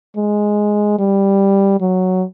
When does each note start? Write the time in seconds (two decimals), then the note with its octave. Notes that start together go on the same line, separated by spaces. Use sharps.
0.16 G#3
0.99 G3
1.80 F#3